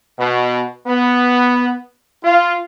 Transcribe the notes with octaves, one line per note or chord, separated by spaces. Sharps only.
B2
B3
F4